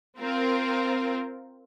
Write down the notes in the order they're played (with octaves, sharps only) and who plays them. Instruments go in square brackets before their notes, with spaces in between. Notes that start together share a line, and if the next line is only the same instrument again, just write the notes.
[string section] C4 F4 A#4